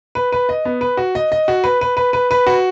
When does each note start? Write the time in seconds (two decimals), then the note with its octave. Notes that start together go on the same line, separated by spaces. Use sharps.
0.15 B4
0.32 B4
0.49 D#5
0.65 B3
0.81 B4
0.97 F#4
1.15 D#5
1.32 D#5
1.48 F#4
1.64 B4
1.81 B4
1.97 B4
2.13 B4
2.31 B4
2.47 F#4